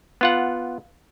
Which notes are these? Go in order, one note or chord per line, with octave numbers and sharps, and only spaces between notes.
B3 F4 F#5